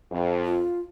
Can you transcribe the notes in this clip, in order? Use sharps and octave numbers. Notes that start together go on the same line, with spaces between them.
F2
F4